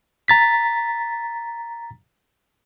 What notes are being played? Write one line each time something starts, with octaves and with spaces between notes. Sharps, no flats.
A#5 A6 B6